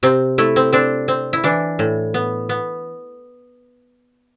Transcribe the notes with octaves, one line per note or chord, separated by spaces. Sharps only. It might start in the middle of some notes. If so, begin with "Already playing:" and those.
C3 C4
A3 E4
C4
C4 D4
C4
E4
E3 D4
A2
B3
B3